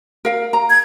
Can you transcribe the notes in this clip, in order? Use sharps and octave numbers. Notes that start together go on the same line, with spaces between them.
A#4 F5
A#5
G#6